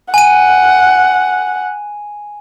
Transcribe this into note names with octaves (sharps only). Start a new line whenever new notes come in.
F#5 G#5 D#7